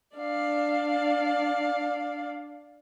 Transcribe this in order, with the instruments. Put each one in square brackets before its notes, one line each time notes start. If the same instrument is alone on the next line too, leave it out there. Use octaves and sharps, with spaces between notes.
[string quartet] D4 D5 F5